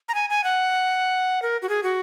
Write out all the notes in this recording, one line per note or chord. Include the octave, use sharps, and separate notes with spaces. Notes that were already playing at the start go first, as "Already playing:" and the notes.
A#5
G#5
G#5
F#5
A#4
F#4
G#4
F#4